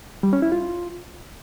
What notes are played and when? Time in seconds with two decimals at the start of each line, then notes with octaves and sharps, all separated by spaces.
0.23 G3
0.33 C#4
0.42 E4
0.52 F4